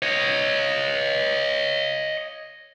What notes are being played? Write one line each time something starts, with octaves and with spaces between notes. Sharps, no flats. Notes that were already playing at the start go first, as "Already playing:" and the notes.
C#5 D#5